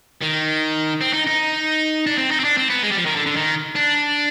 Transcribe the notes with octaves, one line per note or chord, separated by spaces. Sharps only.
D#3
C4
D#4
D#4
D4
C4
D#4
C4
D4
C4
B3
G#3
G3
F3
D#3
D3
D3
D#3
D4